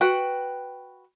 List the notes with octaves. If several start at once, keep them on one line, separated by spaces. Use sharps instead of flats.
F#4 B4 G5